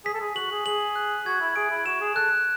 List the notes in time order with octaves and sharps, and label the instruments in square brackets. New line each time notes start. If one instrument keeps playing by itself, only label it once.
[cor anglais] G#4 [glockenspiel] B6
[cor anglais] A4
G#4
[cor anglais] F#4 [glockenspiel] F#7
[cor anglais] G#4
[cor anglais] G#4 [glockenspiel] F#7
[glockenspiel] F#6
[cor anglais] F#4 [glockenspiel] G#6
[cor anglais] E4
[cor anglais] G#4 [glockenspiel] D7
[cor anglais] E4
[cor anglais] F#4 [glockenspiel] E7
[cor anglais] G#4
[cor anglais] A4 [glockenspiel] F#6